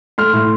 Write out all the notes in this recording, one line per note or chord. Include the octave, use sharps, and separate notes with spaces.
A3 C6 F6
A2